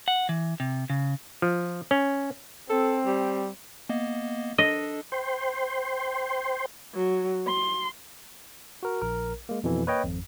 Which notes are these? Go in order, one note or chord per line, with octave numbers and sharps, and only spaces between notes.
F#5
E3
C3
C#3
F3
C#4
C4 A4
G3
A#3 B3 D#5
D4 A4 D#5
C5 G5 C6
F#3
C6
F#4 A#4
A#1 A#4
G#3 A#3
F2 B2 E3
A#3 B4 C#5 D#5 G5
G#1 F2